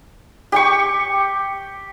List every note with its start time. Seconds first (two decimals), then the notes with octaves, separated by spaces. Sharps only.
0.52 G4 G5 C#6